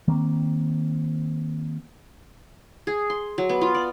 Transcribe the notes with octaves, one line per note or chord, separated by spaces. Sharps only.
D#3 A#3 C4
G#4
C6
F#3
B3
F4
D5